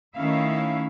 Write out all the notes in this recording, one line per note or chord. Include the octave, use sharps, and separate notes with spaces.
D#3 A3 C#4 E4 E5 F5